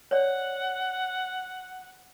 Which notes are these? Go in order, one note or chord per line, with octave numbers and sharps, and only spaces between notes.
C#5 D5 F#5